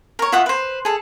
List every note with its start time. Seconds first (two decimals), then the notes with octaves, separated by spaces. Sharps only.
0.19 A#4 C#5
0.32 F4 E5 F#5 D#6
0.46 B4 C5
0.85 G#4 A4